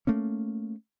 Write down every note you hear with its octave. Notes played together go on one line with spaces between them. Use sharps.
A3 A#3 C#4